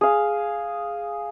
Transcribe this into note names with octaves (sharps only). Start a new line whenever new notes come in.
G#4 F5